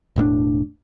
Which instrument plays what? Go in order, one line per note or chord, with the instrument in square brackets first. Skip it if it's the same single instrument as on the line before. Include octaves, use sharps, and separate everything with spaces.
[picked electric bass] E1 A2 A3 D4